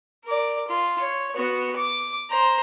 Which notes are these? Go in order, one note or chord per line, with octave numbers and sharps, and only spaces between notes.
A#4 D5
F4
C#5
B3 F#4
D6
C5 A#5